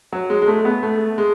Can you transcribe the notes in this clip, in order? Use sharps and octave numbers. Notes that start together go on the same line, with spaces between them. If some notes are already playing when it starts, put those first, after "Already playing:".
F#3
G#3
G#3
A3
B3
A3
G#3